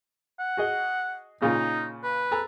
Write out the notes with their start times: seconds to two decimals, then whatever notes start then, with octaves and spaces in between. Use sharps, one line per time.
0.39 F#5
0.57 F#4 G#4 D#5
1.42 A#2 C#3 D#4 F4
2.04 B4
2.32 A4 G#5 A#5